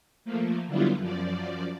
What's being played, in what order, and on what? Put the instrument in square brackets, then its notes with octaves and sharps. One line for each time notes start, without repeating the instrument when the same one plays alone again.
[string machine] F3 A3 A#3
D3 F#3 G3 B3 E4 F4
F#2 F3 D5